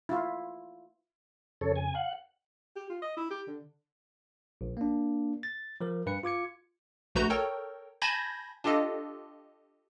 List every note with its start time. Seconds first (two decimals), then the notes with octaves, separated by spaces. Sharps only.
0.09 E4 F4
1.61 F2 C#3 A4 C#5
1.76 G#5
1.95 F5 F#5
2.76 G4
2.90 F4
3.02 D#5
3.17 E4
3.31 G4
3.48 D3
4.61 A#1
4.77 A#3 D4
5.43 A6
5.81 F3 A#4
6.06 G2 B4 C#7
6.23 F4 D6 G#6 C#7
7.15 A#1 A3 F#4 B4 A#5 G6
7.30 A4 A#4 C#5 G5
8.02 G#5 A5 B5 G6 G#6 A#6
8.64 D4 F4 G4 A4 D#5